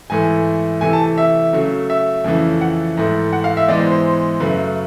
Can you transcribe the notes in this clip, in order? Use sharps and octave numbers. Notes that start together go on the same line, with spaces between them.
G#2 E3 A3 G#5
C3 E3 A3 G#5
A5
E5
C#3 F#3 A3
E5
F2 C#3 E3 A3
F#5
G#2 E3 A3
F#5
F5
E5
G#2 E3 G#3 B3 D5
C5
C5
F#2 C#3 F#3 A3 B4